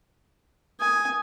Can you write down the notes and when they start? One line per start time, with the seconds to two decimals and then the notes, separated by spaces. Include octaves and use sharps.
0.80 G#5 D#6